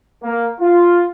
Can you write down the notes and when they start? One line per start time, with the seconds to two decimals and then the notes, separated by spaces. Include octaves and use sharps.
0.23 A#3
0.60 F4